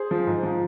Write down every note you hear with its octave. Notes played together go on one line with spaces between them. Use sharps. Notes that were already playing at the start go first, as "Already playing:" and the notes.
Already playing: G#4 C5
F3
G#2
F3